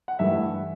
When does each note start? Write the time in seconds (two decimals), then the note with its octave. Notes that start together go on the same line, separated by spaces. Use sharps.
0.08 F#5
0.19 G2 E3 A3 E5